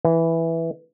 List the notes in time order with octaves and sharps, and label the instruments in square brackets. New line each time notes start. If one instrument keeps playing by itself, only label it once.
[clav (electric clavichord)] E3